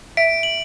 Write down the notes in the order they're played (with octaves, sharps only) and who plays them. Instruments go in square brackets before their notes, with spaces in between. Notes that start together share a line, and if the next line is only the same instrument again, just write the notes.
[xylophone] E5 [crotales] D7
[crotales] F#7